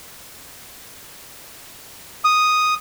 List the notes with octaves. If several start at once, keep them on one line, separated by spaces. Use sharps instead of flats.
D#6